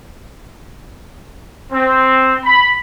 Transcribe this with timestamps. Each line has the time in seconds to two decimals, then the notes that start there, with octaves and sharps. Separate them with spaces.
1.72 C4
2.44 B5